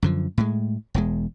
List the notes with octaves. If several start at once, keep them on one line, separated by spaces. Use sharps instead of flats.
F#2 D3 F3
A2 G#3
E1 E2 G#3